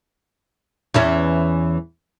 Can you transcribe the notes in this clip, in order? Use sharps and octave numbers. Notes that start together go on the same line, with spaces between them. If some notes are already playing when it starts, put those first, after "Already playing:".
E2 E3 C#4